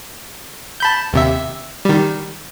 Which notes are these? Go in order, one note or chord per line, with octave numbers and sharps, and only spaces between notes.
A5 B5 G6
D#2 C3 E5
D#3 G3